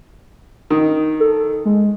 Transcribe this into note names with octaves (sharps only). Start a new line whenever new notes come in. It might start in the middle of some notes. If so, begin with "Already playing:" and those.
D#3
A4
G#3